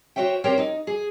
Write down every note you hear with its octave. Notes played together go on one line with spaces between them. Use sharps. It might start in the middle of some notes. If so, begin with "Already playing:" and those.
F#4 C5 C#5 E5 G5
C4 G4 A#4 C5 C#5 G5
D#4
G#4